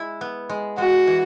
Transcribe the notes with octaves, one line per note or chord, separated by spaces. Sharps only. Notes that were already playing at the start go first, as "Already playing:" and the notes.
Already playing: G#3 E4
B3
G#3
G#3 F#4
E3